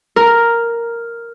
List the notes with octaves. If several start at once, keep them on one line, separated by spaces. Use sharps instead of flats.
A#4